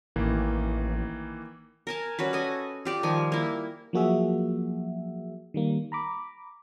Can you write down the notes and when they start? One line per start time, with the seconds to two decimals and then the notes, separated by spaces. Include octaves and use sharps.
0.16 A1 D#3 E3 A#3
1.87 A#4 G#5 A5
2.19 G3 C#4 F#4 B4
2.33 A4 D#5 G#5
2.85 F4 G4 D5
3.03 D#3 F3 G3 G#5
3.32 A#3 E4
3.93 F3 F#3 A#3 F#4 G#4 E5
5.54 D#3 G3 A#3
5.92 A#5 B5 D6